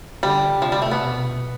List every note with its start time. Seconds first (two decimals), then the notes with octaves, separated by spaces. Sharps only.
0.23 D3 G3
0.62 C3 F3
0.72 G3
0.82 A3
0.91 B3
1.02 B2